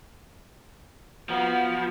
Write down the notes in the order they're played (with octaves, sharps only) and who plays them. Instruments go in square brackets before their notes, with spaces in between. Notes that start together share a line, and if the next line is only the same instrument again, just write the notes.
[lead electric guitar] F3 [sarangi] B3 [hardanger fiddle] F#4